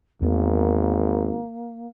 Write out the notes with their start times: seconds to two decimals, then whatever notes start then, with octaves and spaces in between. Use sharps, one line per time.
0.22 G#1 E2 A#3 B3